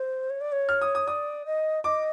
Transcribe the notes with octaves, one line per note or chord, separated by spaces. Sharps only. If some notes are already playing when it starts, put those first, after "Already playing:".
Already playing: C5
C#5
D5
C#5
F6
D#6
D#6
D5 D#6
D#5
D#5 D6